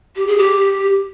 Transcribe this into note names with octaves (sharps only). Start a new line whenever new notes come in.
G4
G#4
G4